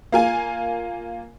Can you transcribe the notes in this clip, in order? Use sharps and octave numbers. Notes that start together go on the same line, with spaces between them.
A#3 F4 G#5